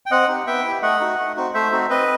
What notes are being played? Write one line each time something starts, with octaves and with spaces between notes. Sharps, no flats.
G5
C4 D#5 F#5
D#4 G4
B3 E5 G5
E4 G4
A3 D#5 F#5
D#4 F#4
A3
C4 D#4 F#4
A3 C5 E5
C4 D#4 F#4
C4 B4 D#5